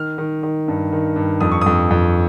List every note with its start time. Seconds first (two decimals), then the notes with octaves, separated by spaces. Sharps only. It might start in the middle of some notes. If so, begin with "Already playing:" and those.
Already playing: D#3 F6
0.18 D#3
0.43 D#3
0.68 G2
0.93 D#3
1.16 G2
1.41 F2 D#6
1.52 C#6
1.61 F2 D#6
1.90 F2